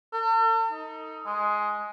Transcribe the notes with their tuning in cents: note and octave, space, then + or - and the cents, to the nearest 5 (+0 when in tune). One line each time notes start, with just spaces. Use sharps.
A4 +45
D#4 +20
G#3 +10